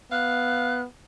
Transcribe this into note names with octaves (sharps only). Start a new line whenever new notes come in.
B3 F5 F#6